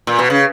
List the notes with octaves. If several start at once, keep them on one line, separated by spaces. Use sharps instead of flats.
A#2
B2
C#3